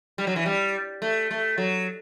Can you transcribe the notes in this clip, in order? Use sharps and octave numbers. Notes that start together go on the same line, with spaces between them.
G3
F#3
E3
G3
A3
A3
F#3